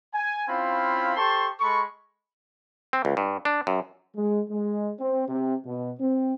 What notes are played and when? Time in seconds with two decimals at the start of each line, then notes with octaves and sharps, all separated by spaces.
0.14 G#5
0.48 C4 C#4 E4 F4 F5 B5
1.16 G4 A4 C5 A5 C6 C#6
1.60 G#3 A4 B5 C#6
2.93 C4
3.05 C#2
3.17 G2
3.45 D4
3.67 F#2
4.15 G#3
4.49 G#3
5.00 C4
5.29 C3
5.65 B2
5.99 C4